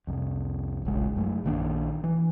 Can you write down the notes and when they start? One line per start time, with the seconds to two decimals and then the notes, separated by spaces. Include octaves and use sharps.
0.07 C2 F2
0.84 D#1 A#1 C#3 G#3
1.16 F#2 A3
1.45 A#1 D#3 A#3 D4
2.04 E3